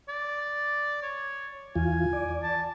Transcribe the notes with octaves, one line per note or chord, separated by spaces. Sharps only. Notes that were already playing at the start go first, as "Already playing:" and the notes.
D5
C#5
E2 E3 F4 G#5
D5
A5